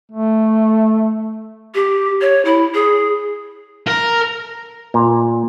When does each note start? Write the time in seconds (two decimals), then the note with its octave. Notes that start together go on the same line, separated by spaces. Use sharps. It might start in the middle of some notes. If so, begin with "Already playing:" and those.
0.12 A3
1.75 G4
2.21 C#5
2.45 E4
2.74 G#4
3.87 A#4
4.94 A#2